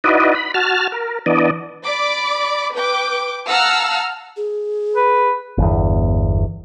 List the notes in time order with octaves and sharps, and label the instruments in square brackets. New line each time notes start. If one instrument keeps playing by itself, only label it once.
[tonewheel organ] D#4 E4 F#4 B4 D5 D#5
B5
F#4 A5 F6
A#4
E3 B3 D4 D5 D#5
[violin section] D5 B5 D6
B4 G5 D6
F5 F#5 A5 A#5 E6 F6
[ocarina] G#4
[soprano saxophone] B4
[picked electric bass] G1 E2